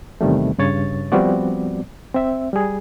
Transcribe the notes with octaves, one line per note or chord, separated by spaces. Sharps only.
E2 C3 D#3 G3 A3
G2 C#3 C#5 A6
F3 G3 B3 C4 F#4 D5
C4 E5
G3 G#4